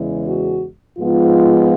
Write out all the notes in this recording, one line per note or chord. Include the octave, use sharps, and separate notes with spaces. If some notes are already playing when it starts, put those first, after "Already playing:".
Already playing: E2 C#3 E3 G#3
F#4
G#2 F3 G#3 B3 F4